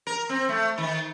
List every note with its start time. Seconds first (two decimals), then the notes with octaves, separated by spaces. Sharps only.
0.07 A#4
0.29 C4
0.49 A3
0.78 D#3